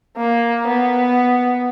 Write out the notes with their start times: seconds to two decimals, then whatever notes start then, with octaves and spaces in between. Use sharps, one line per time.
0.17 A#3
0.67 B3